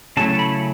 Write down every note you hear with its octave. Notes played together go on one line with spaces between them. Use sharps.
C#3 F#3 A3 E4 A5
B5